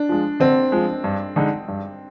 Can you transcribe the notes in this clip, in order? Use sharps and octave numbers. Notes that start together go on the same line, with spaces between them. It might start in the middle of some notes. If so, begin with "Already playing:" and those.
Already playing: D4
F3 G#3
D3 C4
F3 G#3
G2
D3 G#3 D#4
G2